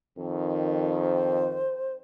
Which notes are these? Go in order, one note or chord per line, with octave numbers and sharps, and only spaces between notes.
F2 D#3
C5